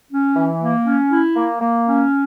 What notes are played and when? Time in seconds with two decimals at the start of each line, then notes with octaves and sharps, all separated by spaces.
0.11 C#4
0.36 E3
0.61 A#3
0.86 C#4
1.11 E4
1.36 A#3
1.61 A#3
1.87 C#4